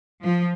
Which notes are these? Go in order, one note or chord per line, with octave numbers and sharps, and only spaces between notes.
F3